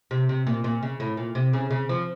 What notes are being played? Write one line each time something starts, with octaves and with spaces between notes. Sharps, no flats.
C3
C3
A#2
A#2
C#3
A2
A#2
C3
C#3
C#3
F3